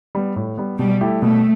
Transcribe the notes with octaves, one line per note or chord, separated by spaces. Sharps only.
G3 B3
A2
G3 B3
B2 G3
A3 E4 G4
B2 A3